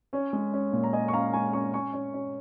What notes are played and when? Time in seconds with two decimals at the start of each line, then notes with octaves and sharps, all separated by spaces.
0.13 C#4 C#5
0.33 G#3
0.53 C#4
0.73 A#2
0.84 A#5
0.93 C#4 D#5 G#5
1.08 C#6
1.13 C#4 F5 A#5
1.33 G#3 G#5 C#6
1.53 C#4 G#5 C#6
1.74 C#4 G#5 C#6
1.93 C#4
2.14 C#4